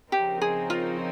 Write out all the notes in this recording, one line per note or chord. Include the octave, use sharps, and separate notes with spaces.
C#3 F3 C4 D#4 G4 A#4
G#4
F4